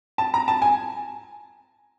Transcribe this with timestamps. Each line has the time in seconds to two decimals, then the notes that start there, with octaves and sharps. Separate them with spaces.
0.18 A5
0.34 A#5
0.48 A5
0.62 G#5